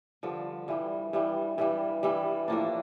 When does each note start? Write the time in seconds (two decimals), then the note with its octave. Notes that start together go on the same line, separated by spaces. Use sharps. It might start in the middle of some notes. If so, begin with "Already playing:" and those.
0.23 G2 D3 F3
0.68 G2 E3 G3
1.13 G2 E3 G3
1.58 G2 E3 G3
2.03 G2 E3 G3
2.48 A2 F3 A#3 D4